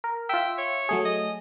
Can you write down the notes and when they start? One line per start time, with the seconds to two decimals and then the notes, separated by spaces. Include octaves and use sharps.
0.04 A#4
0.29 F4 E5 G5
0.58 C#5
0.89 F#3 A3 G#4
1.05 D#5